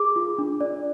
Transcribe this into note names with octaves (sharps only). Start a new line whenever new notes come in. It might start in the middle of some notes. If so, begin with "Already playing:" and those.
Already playing: G#4 D6
F4
D4
D5